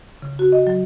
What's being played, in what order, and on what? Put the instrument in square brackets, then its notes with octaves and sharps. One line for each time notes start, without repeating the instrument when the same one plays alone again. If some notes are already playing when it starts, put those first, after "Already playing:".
[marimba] C#3
F#4
D#5
F#3